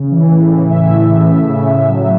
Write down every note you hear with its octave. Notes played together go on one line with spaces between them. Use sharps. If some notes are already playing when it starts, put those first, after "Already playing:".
Already playing: C#3
E3
A2
E3
A2 E5
A2
A2
C#3
C#3
C#3
F#3